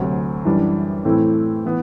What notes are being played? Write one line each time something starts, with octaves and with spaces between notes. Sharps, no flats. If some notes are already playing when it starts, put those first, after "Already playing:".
Already playing: D2 C3 F#3
F#2 E3 G3 D4
A2 E3 A3 C4 E4
E3 B3